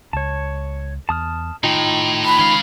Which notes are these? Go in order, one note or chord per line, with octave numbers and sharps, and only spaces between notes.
C#2 C#5 A5
E2 A5 D#6 F6
A2 D#3 D#4 F4 G5
B5
D#3 G#3 C#4 F5